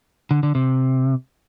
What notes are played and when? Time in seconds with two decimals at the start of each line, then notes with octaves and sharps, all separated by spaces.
0.31 D3
0.43 D3
0.55 C3